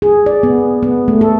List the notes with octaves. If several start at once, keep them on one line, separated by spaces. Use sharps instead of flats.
G#4
D5
B3
B3
A3
A4